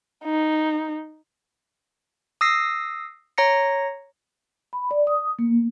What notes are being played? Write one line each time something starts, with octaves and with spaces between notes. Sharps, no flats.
D#4
D#6 E6 A#6 C7
C#5 A#5 A#6 C#7
B5
D5
D#6
A#3